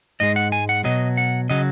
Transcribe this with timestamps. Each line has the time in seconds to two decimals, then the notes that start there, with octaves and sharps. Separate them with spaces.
0.20 G#2 G#3 D#5
0.36 F#5
0.52 G#5
0.69 F#5
0.84 B2 F#3 D#5
1.17 F#5
1.50 C#3 F#3 D#5